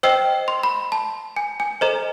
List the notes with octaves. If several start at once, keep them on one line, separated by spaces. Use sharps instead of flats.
C5 D#5 G5 E6
C6
B5
A5
G#5
G#5
A4 C5 D#5 A#5